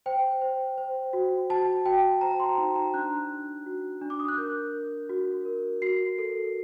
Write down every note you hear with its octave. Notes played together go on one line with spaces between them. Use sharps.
C5 G5
C5
C5
F#4
F#4 A5
F#4 G5
C5 A#5
C6
D#4
A#5
D4 F#6
D4
F#4
D4
D6
D#6
F#6
A#4 G6
A#4
F#4
A#4
F#4 C7
A4